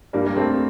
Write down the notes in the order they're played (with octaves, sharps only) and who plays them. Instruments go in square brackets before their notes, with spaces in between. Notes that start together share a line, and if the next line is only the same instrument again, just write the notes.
[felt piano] G2 [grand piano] G3 A#3
[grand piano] A#3
A3 C4